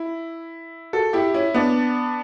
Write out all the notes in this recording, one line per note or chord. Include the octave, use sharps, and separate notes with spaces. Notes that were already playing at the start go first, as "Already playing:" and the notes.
Already playing: E4
F#4 A4
E4 G4
C#4 E4
B3 D4